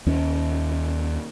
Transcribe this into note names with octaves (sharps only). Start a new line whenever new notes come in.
D#2 C#4